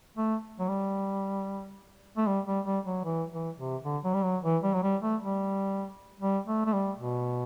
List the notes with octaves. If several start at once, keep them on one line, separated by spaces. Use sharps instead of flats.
A3
F#3
G3
A3
G3
G3
G3
F#3
E3
E3
C3
D3
F#3
G3
F#3
E3
G3
F#3
G3
A3
G3
G3
A3
A3
G3
B2